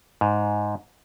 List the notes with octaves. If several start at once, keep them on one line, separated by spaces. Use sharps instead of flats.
G#2